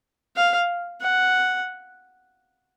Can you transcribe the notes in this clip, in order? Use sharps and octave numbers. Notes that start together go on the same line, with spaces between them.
F5
F#5